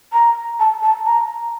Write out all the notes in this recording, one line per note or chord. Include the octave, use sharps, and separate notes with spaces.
A#5
A5
A5
A#5